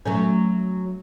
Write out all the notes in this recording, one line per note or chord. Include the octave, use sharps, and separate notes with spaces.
F#3 A3 C#4